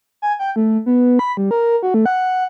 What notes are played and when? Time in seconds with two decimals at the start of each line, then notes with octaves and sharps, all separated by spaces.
0.22 G#5
0.39 G5
0.56 A3
0.86 B3
1.19 B5
1.37 G3
1.51 A#4
1.83 F#4
1.94 A3
2.06 F#5